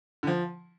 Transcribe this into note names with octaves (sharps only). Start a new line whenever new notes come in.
D3
F3